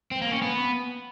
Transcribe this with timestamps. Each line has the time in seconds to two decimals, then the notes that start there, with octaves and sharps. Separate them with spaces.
0.11 C4
0.21 A#3
0.32 C#4
0.42 B3